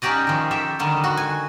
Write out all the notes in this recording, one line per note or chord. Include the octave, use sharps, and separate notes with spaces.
C#4 D#4 F#4 G4 D5 D#5
D#3 F3
G4 A4 E5
D3 D#3 G3
F#4
G#5